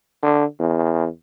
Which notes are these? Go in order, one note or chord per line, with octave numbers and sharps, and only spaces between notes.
D3
E2